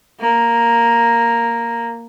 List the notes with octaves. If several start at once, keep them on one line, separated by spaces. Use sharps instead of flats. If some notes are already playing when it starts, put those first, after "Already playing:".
A#3